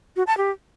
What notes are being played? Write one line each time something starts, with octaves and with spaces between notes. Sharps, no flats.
F#4
A5
G4